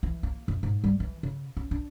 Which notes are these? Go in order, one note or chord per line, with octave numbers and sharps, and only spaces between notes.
E3
A#3
F#2
G#2
G3
E3
C#3
C#4
D4